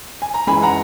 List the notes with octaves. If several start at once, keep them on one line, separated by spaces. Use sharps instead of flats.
G#5
A#5
F#2 E3 G#3 G#5 B5
B5
F#5 A#5